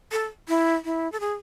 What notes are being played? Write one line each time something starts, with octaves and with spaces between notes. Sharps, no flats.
A4
E4
E4
A4
G#4